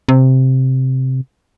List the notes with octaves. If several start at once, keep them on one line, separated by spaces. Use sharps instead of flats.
C3